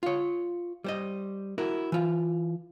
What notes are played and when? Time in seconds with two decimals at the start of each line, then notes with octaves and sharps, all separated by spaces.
0.03 F4 C#5
0.84 G3 C5 D#5
1.58 E4 F#4 A#4
1.92 E3 F4